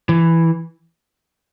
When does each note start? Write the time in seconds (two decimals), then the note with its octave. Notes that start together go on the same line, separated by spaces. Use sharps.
0.09 E3